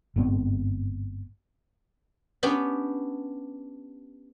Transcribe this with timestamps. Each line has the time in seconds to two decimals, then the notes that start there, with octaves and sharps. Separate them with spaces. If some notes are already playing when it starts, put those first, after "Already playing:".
0.16 G1 G#2 B3 C4
2.43 B3 C#4 D4 G4